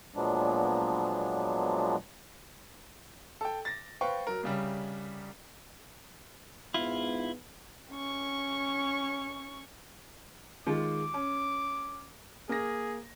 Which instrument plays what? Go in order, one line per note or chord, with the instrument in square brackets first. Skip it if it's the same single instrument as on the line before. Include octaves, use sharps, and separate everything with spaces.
[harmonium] A#2 F3 F#3 G#3 B3 D4
[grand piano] A4 G5
A6 A#6
B4 C5 F5 G5 C#6
F#3 A#4
C2 C#3 G3
[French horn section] G#2 B3 [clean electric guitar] E4 F4
[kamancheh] C#4 C#6
[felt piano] D#3 G#3 F4 [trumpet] D6
[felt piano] C#4
[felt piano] A#3 A#6 [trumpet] G#4